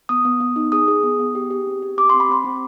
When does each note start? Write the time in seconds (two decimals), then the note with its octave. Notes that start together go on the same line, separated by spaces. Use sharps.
0.09 B3 D#6
0.25 B3
0.40 B3
0.56 D#4
0.72 G#4 D#6
0.88 G#4
1.03 B3
1.19 B3
1.35 G4
1.50 G4
1.67 C4
1.82 G4
1.98 G4 D6
2.10 C4 C6
2.20 B5
2.29 C4 C6
2.45 C4